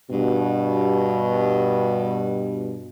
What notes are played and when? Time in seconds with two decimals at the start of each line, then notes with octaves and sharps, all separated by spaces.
0.11 G2 B2